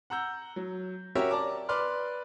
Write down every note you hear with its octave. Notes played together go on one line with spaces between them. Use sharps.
F#5 A#5 E6 G6
F#3
C#4 F#4 G4 A#4 C#5 E5
D5 A5 A#5 D6
B4 D5 C6 D6 F6